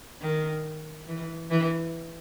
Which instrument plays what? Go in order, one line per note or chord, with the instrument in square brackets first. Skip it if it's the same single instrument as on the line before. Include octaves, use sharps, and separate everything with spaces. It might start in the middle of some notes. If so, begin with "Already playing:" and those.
[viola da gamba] D#3
E3
E3